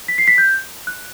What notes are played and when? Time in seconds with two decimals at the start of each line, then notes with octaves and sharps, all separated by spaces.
0.08 B6
0.18 C7
0.28 B6
0.38 G6
0.87 F#6